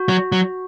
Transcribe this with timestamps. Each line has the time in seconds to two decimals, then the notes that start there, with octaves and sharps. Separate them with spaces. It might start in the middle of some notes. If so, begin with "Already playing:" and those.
Already playing: F#4
0.09 F#3
0.32 F#3